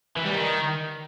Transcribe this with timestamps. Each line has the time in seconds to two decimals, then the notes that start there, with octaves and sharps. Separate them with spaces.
0.16 E3
0.25 G3
0.33 D#3